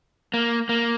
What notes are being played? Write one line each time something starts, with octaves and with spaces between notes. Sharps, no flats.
A#3
A#3